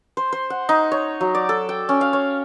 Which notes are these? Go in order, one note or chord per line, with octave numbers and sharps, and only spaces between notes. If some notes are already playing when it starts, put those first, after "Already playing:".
C5
C5
F#5
D#4
C#5
F#3
D5
A4
G5
C#4
F5
C#5